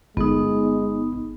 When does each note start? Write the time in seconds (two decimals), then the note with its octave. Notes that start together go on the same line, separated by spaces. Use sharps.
0.17 G1 G#3 B3 D#4